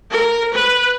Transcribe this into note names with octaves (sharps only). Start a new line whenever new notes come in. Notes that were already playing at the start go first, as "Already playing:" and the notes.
A#4
B4